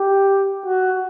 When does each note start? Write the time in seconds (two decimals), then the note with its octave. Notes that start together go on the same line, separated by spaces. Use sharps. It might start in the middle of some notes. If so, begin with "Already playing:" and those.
Already playing: G4
0.66 F#4